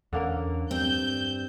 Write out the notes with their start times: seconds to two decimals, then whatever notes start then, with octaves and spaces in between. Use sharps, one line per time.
0.13 E2 D3 A#3 C#4 A#4
0.71 G2 C4 G6